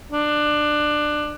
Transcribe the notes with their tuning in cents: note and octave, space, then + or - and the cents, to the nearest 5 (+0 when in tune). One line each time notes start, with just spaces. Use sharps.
D4 +20